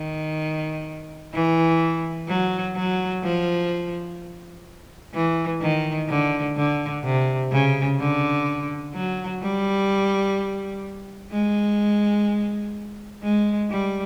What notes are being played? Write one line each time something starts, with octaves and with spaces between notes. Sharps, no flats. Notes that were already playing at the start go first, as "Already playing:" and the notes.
Already playing: D#3
E3
F#3
F#3
F3
E3
D#3
D3
D3
C3
C#3
D3
F#3
G3
G#3
G#3
G3